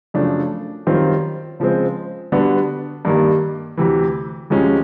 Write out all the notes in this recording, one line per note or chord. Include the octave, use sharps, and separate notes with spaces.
F#2 C#3 F3 A3 D4
F#2 D#3 G3 C4 F4
C#3 F3 G#3 C4
D3 G3 B3 D4 F#4
G2 D#3 G3 A#3
D2 C3 E3
D2 C3 F3 G#3 C#4